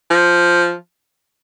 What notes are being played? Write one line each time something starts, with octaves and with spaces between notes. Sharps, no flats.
F3